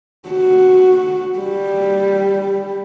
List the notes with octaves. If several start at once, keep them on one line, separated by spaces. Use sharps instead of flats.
F#4
G3